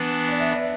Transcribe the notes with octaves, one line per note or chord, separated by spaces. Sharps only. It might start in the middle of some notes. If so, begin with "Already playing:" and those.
Already playing: E3 B3 D4 B4
D5
E5
B4 D5